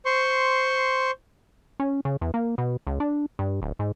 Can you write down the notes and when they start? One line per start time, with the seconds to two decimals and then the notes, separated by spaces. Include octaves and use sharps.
0.05 C5 C6 C#6
1.80 C#4
2.05 C#3
2.21 E2
2.34 A#3
2.58 B2
2.87 C#2
3.00 D4
3.39 G2
3.62 D1
3.79 G#2